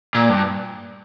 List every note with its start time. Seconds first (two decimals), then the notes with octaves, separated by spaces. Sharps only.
0.15 A#2
0.29 G2